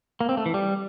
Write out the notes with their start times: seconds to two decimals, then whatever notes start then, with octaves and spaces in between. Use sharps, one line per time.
0.21 A#3
0.29 C4
0.37 A3
0.46 E3
0.54 G3